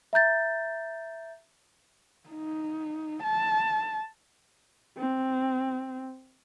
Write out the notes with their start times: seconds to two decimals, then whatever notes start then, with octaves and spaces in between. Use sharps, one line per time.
0.13 E5 A#5 G6 A6
2.30 D#4
3.23 A5
4.98 C4